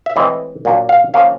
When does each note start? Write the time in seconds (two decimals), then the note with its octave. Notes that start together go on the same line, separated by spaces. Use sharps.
0.06 E5
0.16 A2 E3 G#3 C4 D#5
0.65 A#2 F#3 A#3 D4
0.89 F5
1.14 F3 A#3 C#4 F5